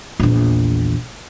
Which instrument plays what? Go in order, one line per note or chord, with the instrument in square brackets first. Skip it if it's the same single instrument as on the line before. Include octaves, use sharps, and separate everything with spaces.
[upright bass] A#1 E2